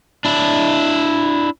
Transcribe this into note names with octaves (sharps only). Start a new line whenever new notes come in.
D4 E4